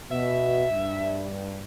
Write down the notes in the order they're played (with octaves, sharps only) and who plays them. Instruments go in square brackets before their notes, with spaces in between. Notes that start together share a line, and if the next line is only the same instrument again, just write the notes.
[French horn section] B2 [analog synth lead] E5
[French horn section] G2